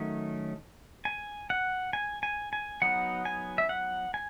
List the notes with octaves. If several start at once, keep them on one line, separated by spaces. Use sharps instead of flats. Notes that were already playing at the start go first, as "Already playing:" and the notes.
Already playing: D#3 F#3 A3 C#4
G#5
F#5
G#5
G#5
G#5
F#3 B3 D#4 F#5
G#5
E5
F#5
G#5